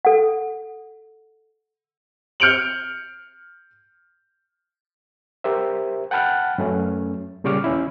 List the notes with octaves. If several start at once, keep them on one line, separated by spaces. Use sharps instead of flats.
A4 F#5
F6 G6 C#7 D7 F7 F#7
G4 A#4 C5 E5
F#5 G5 A5 B5 F6 F#6
F#2 A3 C#4
A#2 C#3 G3 C#6 D6 F6
D#2 C#4 E4